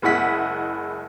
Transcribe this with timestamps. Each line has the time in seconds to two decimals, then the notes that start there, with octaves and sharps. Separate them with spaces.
0.02 F#1 G#3 E4 F#5 B6